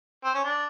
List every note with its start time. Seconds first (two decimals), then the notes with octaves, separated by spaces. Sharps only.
0.24 C4
0.34 C#4
0.44 D4